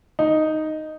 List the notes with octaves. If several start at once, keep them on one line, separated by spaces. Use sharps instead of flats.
D#4